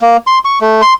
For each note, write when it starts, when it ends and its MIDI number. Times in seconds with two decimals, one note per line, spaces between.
0.02 0.17 58
0.27 0.39 84
0.45 0.59 85
0.61 0.81 57
0.82 0.94 84